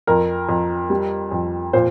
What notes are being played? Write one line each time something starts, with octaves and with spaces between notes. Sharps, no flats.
F2 A#4
F2
G3
F2
A#2 C5